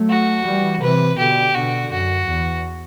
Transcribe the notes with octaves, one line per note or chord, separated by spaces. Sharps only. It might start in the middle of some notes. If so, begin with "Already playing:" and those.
Already playing: F#3 A3
F#4
E3 G3
C3 E3 B4
B2 D3 G4
B2 D3 F#4
F#2 F#4
E2